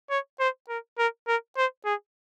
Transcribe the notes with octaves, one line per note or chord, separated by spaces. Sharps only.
C#5
C5
A#4
A#4
A#4
C5
G#4